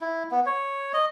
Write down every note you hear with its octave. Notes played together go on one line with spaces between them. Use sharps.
E4
B3
C#5
D#5